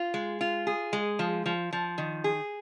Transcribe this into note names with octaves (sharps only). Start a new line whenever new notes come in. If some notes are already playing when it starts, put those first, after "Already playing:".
Already playing: F4
G#3
F4
G#4
G#3
F3
F3
F3
D#3
G#4